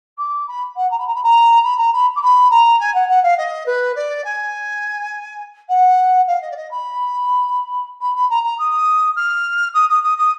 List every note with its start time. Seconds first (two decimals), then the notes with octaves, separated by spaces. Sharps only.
0.18 D6
0.47 B5
0.76 F#5
0.91 A#5
0.98 B5
1.06 A#5
1.14 B5
1.23 A#5
1.63 B5
1.77 A#5
1.93 B5
2.15 D6
2.22 B5
2.50 A#5
2.79 G#5
2.94 F#5
3.08 F#5
3.23 F5
3.37 D#5
3.66 B4
3.95 D5
4.24 G#5
5.69 F#5
6.27 F5
6.41 D#5
6.51 D5
6.56 D#5
6.71 B5
8.00 B5
8.15 B5
8.30 A#5
8.43 A#5
8.58 D#6
9.16 F6
9.74 D#6
9.89 D#6
10.03 D#6
10.17 D#6